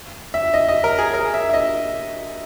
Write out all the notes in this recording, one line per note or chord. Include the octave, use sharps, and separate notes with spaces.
E5
D#5
D#5
A#4
G#4
A#4
E5
E5
D#5